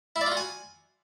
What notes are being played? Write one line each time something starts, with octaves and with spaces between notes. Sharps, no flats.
E4
D5
F4
F#4
G#5